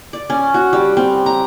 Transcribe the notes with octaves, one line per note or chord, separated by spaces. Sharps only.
D5
C#4
F#4
G3
C4
A#5